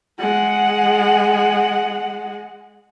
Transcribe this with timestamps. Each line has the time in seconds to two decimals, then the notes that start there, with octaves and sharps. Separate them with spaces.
0.19 G#3 F#5